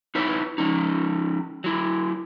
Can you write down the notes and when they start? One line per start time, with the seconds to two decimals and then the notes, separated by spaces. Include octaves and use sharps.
0.15 D#4 E4 B4 C#5
0.58 F3 C#4 D#4
1.64 F#3 E4